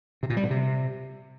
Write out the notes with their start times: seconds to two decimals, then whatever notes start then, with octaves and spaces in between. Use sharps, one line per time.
0.23 C3
0.30 A#2
0.37 G3
0.44 B2
0.51 C3